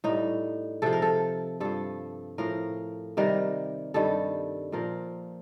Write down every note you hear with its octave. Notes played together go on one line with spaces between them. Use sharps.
A2 G3 D#4
C3 F3 A4
A#4
A4
G2 F3 A4
A2 F3 A#4
C3 D#3 G3 A#4
G2 D#3 G3 A4
A#2 F3 A#4